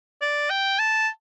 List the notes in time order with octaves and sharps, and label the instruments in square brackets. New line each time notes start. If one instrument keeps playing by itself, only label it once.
[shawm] D5
G5
A5